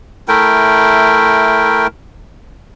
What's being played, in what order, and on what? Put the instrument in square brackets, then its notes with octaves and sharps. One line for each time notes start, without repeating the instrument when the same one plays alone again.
[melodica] A3 E4 A#4 G5